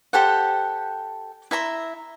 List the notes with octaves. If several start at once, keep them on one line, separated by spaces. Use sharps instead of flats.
G4 A4 C5 F#5
E4 E5 A#5 C6